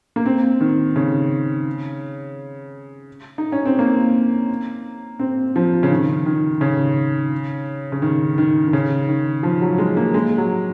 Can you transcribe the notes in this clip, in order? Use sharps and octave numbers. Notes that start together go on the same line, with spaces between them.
A#3
C4
D#3
C#3
D#4
C#4
C4
A#3
C4
F3
C#3
D#3
D#3
C#3
C#3
D#3
D#3
D#3
C#3
D#3
F3
F#3
G#3
A#3
G#3
F#3